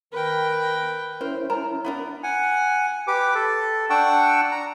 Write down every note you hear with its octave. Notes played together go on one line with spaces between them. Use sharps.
D#3 A#4 B4 G5
C#4 E4 A#4 C5
D#4 A#4 A#5
B3 D4 A#4
F#5 G#5
G4 B4 D6
A4
D4 F#5 G5 C#6 E6
A#5